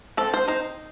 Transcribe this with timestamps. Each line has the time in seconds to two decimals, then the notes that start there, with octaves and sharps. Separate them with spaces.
0.17 C4 A4
0.34 C5
0.48 D#4 C5